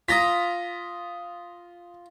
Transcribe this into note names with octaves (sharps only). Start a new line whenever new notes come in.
F4 A#5 D#6 A#6 B6